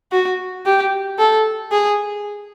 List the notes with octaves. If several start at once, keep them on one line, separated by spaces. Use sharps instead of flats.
F#4
G4
A4
G#4